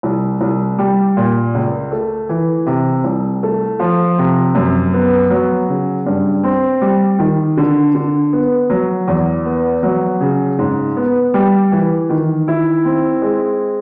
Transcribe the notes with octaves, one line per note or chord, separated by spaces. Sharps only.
C2
C2
G3
A#2
C#2
A3
E3
C3
C2
A3
F3
C3
F#2
B3
F#3
C#3
G2
C4
G3
D#3
D3
D3
B3
F#3
E2
B3
F#3
C#3
G#2
B3
G3
E3
D#3
E4
C4
G#3